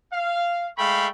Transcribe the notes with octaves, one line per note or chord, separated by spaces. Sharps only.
F5
G#3 A3 F5 G5 B5 C#6